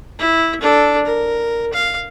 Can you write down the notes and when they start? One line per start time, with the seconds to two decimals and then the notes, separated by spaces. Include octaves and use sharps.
0.19 E4
0.61 D4 A4
1.05 A#4
1.74 F5